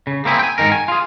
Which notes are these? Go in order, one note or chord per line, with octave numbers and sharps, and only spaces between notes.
C#3
A#3 C4 E4 G#4
G5 G#5
G#2 B2 D#3 A#4
G#5
F4 G#4